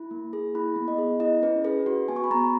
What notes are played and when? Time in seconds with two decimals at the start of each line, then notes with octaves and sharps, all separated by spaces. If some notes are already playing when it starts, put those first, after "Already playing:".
Already playing: E4 B5
0.11 A#3
0.33 G#4
0.55 E4 B5
0.76 B3
0.88 D#5
0.98 G#4
1.20 E4 D#5
1.43 C#4 B4
1.65 G#4 B4
1.86 F#4
2.08 B3 G#5
2.16 C#6
2.24 B5
2.31 B3 A#5